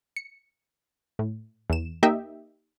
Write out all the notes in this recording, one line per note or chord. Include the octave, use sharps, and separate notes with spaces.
C#7
A2
E2 E7
A#3 D#4 G4 D#5 E5 G5